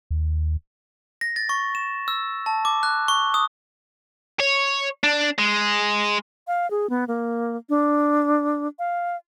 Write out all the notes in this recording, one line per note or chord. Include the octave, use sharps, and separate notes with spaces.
D#2
A#6
A6
C#6
E7
E6
A5
D6
F#6
C#6
D#6
C#5
D4
G#3
F5
G#4
B3
A#3
D4
F5